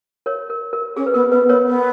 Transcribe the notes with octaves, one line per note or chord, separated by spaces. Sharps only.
A#4 C#5
A#4
A#4
C#4 G#4
B4
B3 A#4
B3 B4
B3 A#4 C#5
B3